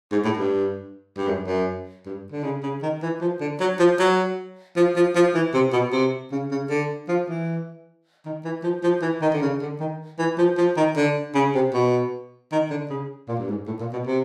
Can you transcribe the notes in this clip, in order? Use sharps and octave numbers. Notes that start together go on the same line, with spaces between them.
G#2
A2
G2
G2
F#2
F#2
G2
D3
C#3
C#3
D#3
E3
F3
D3
F#3
F3
F#3
F3
F3
F3
E3
C3
B2
C3
C#3
C#3
D3
F3
E3
D#3
E3
F3
F3
E3
D#3
D3
C#3
D3
D#3
E3
F3
F3
D#3
D3
C#3
C3
B2
D#3
D3
C#3
A#2
G2
G#2
A2
A#2
B2
C3